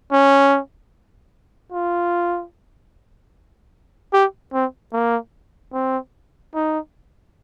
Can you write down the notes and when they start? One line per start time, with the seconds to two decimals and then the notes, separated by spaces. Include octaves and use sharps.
0.11 C#4
1.72 F4
4.13 G4
4.53 C4
4.93 A#3
5.73 C4
6.55 D#4